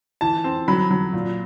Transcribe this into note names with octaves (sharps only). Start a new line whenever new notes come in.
E3 A5
C4
F#3 B5
F#3
A#2